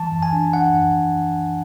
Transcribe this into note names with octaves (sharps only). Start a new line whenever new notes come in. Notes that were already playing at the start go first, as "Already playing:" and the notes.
Already playing: E3 A5
F#2
G#5
D4
D4 F#5
F#2